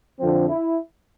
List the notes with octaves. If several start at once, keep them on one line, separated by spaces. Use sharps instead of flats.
F2 D3 F3 C4
E4